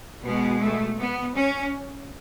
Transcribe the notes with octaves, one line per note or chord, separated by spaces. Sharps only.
B2 G#3 B3
A3
B3
C#4